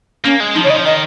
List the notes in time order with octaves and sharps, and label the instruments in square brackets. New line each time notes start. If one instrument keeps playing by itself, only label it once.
[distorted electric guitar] A#3 [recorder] C#4
[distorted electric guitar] G#3
[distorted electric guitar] F3 [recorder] D#4
[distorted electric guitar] C#3 [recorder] C#5
[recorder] D#5
[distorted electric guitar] F3
[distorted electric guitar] D#3 [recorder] D#5